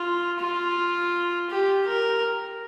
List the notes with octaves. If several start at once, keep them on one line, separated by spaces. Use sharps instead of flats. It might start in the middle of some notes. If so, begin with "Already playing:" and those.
Already playing: F4
F4
G4
A#4